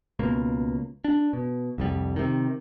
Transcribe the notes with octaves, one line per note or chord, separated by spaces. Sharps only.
C#2 B2 A#3
D4
B2
C2 F2 G3
C3 D#3